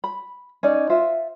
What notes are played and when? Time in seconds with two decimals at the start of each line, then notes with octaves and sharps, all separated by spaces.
0.04 B5
0.63 C#4 D#4 D5
0.90 F4 C5 E5